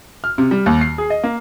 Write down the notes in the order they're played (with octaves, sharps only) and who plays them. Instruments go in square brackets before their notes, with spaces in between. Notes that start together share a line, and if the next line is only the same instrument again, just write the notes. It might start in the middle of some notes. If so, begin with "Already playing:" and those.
[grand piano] F6
C3
G3
D#2
C7
G#4
D#5
A#3